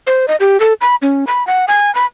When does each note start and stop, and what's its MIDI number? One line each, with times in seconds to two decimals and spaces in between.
0.07 0.26 72
0.28 0.36 75
0.40 0.60 67
0.60 0.73 69
0.81 0.95 83
1.02 1.25 61
1.27 1.46 83
1.47 1.65 78
1.68 1.93 80
1.95 2.05 83